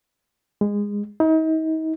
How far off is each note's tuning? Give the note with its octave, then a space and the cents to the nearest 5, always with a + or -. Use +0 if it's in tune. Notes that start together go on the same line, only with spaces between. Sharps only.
G#3 -20
D#4 +40